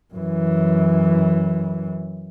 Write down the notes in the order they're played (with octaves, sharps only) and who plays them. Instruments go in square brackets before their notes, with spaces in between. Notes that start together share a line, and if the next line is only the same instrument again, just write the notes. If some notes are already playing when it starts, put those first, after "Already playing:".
[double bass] F#2 E3